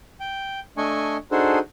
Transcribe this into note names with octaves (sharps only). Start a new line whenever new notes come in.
G5
A3 D4 D#5 G#5 C#6
D4 D#4 F#4 G#4 A4 C5